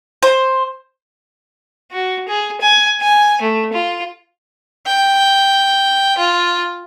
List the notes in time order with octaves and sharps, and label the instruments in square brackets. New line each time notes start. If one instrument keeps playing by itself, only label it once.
[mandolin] C5
[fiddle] F#4
G#4
G#5
G#5
A3
F4
[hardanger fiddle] G5
F4